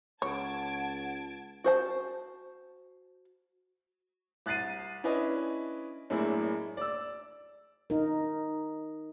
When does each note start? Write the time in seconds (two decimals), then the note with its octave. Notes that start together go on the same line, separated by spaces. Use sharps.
0.22 C#2 C#5 F#5 A5 G#6 D7
1.64 F#4 C5 A5
4.46 C2 F#6 A6 C7 D#7
5.04 C#4 D4 E4 B4 D#5
6.10 F#2 A2 G#3 A#3 D4 E4
6.77 D5 E6
7.90 D#4 A#4